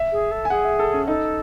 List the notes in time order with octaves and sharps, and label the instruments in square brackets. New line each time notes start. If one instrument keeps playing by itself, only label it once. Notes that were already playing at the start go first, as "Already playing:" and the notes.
Already playing: [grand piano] E5
[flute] G#4
A4
[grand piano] G#5
[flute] G#4 [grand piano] F#5
[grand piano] E5
A4
C#4
[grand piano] D#4 [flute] A4